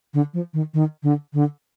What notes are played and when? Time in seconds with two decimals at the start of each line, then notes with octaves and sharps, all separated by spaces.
0.14 D3
0.34 F3
0.53 D#3
0.74 D#3
1.03 D3
1.33 D3